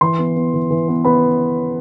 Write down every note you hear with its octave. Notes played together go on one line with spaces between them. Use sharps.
E3 C6
B3
B3
E3
E3
B3
B3 B5